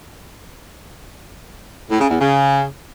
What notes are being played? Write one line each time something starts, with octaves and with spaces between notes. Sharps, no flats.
A2
C#3
E2
C#3